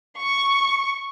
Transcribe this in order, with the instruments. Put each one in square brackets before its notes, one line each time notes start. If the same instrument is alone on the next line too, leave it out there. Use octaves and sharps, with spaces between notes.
[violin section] C#6